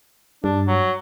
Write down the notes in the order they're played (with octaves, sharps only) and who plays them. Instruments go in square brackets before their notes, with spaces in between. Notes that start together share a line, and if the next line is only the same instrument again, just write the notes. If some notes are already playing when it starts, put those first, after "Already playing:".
[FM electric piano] G2 [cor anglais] D4
[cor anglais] F#3